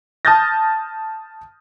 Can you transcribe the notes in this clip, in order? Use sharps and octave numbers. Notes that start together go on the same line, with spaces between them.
A5 D#6 F6 G6 A6 A#6